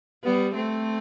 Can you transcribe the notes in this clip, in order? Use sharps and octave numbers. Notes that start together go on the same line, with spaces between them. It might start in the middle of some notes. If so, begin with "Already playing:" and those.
G3 B3
A3 C4